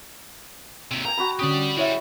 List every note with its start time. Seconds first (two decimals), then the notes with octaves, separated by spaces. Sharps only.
0.91 D#2 C3
1.05 G5 G#5 A#5
1.17 F#4 G5 B5
1.39 D3 C#4 G4 D5 D#6
1.77 G3 G#3 E4 C#5 E5